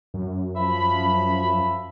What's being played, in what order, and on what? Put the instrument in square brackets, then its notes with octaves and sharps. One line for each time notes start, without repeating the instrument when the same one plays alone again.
[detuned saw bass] F#2
[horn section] F3 E5 B5